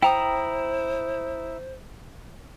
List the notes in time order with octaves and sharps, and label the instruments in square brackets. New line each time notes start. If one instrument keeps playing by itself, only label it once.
[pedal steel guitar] E4 A#5 D#6 [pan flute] C5 [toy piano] G5